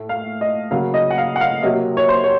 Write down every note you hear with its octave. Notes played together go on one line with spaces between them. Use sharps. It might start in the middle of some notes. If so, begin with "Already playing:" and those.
Already playing: A2 A3
F5
D#5
C#3 F#3 A#3 F5
D#5
F#5
F5
F#5
F5
C3 F#3 A#3 D#5
C#5
C5
C#5